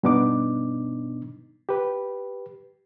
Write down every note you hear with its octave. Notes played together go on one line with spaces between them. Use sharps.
G2 B2 B3 D4 D#4 D6
G4 B4